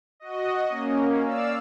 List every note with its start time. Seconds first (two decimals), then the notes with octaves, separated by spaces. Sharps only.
0.20 F#4 D#5
0.69 A#3 C#4
1.25 D5 F5 E6